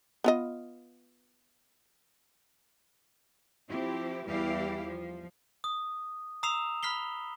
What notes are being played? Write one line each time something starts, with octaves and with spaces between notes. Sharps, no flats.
B3 F4 D#5
F3 C4 E4 G4
E2 E3 G3 E4 G4 F5
F3
D#6
A#5 D#6 E6 C7 E7 F7
B5 F6 B6 C7 G7